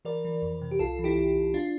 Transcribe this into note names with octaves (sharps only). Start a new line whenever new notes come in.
E3 A#4 D5
E3
F2
C3
G4
C2 F4 A4
E3
E4 G4
C2
C2
D4 F4